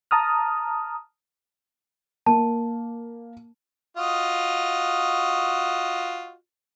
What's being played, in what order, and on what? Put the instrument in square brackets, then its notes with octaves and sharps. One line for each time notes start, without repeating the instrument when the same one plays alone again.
[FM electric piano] A5 A#5 D#6 F6
[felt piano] A#3 [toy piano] A5
[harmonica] F4 F#4 D#5